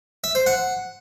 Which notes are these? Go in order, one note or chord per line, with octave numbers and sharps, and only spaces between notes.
E5
C5
F#5